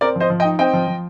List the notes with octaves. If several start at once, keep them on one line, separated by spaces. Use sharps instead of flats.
C4 A#4 D5
F3 C5 D#5
F3
D#5 G5
D#4
C4 D#5 G5
F3
F3